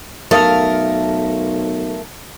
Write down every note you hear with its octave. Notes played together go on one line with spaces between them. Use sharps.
B1 A3 A4 A#4 F5 D#6